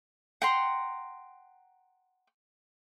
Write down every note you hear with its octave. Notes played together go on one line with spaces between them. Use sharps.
F#5 G5 A#5 C6